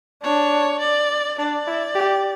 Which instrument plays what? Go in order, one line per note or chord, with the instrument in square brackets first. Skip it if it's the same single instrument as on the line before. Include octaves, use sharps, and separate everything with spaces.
[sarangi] D4 [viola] C#5
[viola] D5
[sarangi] D4 [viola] D5
[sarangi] E4
G4